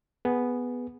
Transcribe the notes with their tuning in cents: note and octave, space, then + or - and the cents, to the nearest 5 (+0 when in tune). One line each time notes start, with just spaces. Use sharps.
B3 +0 G#4 +0